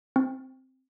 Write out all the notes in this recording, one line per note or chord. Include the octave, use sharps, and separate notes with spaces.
C4